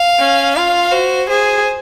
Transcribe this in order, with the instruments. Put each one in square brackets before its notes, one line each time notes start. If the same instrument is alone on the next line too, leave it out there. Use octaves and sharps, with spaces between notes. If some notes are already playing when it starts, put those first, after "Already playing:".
Already playing: [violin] F5
[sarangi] C#4
[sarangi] F4 [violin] F5
[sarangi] F#4 [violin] C5
[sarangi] G#4 [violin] C5